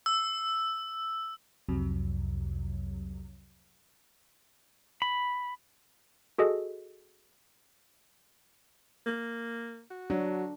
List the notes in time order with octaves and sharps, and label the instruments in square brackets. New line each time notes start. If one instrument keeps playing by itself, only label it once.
[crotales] E6
[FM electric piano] C2 F2 C3 F#3
[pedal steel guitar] B5
[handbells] F#4 G#4 A4 D#5
[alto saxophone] A#3
F#4
[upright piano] F#3 [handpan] D4